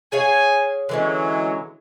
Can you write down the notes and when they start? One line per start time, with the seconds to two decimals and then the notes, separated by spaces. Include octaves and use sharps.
0.12 G#4 C#5 F5 G#5
0.89 D3 E3 F#3 G#3 C#4